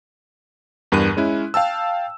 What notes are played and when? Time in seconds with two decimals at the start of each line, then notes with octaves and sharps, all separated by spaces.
0.92 E2 G2 A#4 F#6 D#7
1.17 G#3 C#4 E4
1.54 F5 G5 A5 E6